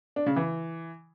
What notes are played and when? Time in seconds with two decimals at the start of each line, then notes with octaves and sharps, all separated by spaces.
0.16 D4
0.26 C#3
0.36 E3